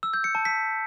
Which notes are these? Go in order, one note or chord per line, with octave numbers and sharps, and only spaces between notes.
E6
G6
C#7
A5
B6